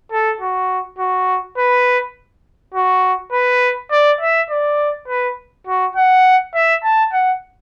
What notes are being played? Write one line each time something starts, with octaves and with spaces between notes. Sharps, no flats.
A4
F#4
F#4
B4
F#4
B4
D5
E5
D5
B4
F#4
F#5
E5
A5
F#5